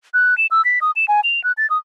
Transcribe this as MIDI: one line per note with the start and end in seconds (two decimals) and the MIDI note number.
0.14 0.37 90
0.38 0.47 100
0.51 0.64 88
0.65 0.79 95
0.81 0.91 87
0.96 1.05 100
1.08 1.21 80
1.24 1.43 101
1.44 1.52 90
1.57 1.69 93
1.70 1.78 87